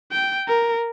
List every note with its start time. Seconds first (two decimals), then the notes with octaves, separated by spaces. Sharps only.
0.12 G5
0.48 A#4